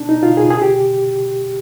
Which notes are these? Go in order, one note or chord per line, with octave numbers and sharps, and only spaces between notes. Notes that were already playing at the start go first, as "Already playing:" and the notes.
Already playing: D4
D#4
F4
G#4
G#4
G4